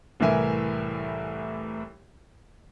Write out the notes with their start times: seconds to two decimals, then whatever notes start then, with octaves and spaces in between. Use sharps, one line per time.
0.20 C2 A2 E3 A#4 E5 G#5